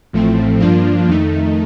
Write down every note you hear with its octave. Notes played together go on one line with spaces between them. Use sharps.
A1 A2 F3 A3 C4
G2 F3 A#3 D4 F4
F2 D#3 A3 D#4